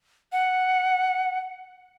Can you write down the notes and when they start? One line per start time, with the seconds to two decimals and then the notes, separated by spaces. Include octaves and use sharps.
0.32 F#5